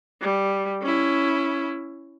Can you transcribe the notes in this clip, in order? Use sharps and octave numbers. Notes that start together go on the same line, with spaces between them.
G3
C#4 E4